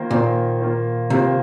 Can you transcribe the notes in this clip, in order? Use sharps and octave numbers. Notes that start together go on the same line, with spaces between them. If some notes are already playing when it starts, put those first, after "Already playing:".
Already playing: D#3 A#3 F4 C5
A#2 D#3 A#3 F4 C5
D#3 A#3 F4 C5
C3 D#3 A#3 F4 C5